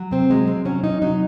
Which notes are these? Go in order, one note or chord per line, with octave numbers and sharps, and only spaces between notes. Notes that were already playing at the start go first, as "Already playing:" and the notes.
Already playing: F#3
C3 C4
F#3 G#3
C3 C4
F#3 C#4
C3 D#4
F#3 D#4